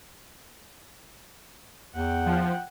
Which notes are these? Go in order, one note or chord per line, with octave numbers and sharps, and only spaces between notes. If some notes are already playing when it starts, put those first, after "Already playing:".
E2 F#5 G5
F3